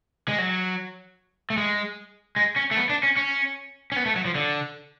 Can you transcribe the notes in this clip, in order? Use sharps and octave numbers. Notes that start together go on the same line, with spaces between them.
G#3
F#3
A3
G#3
G#3
C#4
A3
B3
D4
C#4
C#4
C#4
B3
A3
F#3
F3
D3